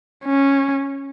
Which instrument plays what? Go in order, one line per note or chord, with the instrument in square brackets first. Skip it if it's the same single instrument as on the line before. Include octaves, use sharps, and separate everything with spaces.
[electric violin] C#4